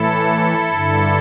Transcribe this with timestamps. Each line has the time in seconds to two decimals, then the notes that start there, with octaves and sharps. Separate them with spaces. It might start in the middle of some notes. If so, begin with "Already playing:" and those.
Already playing: A2 E3 E4 A4
0.71 G2 D3